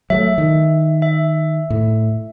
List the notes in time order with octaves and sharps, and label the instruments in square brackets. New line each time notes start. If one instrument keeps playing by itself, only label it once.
[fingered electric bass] F#3 G3 A3 [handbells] E5
[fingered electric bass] D#3
[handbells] E5
[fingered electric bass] A2